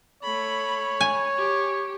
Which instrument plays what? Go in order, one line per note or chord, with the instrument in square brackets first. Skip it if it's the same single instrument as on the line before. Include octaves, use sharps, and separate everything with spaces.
[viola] A3 B5 [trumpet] C#5
[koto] G#5
[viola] G4